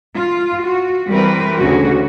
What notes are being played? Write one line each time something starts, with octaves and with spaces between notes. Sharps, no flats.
F4
F#4
E3 G3 C4 A#4 B4
D2 C#3 F#4